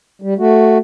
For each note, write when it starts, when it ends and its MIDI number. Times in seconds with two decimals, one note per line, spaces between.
0.22 0.34 55
0.38 0.78 57
0.38 0.78 66